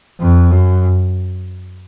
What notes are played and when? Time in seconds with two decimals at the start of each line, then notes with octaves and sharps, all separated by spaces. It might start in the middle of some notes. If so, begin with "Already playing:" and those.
0.19 F2
0.51 F#2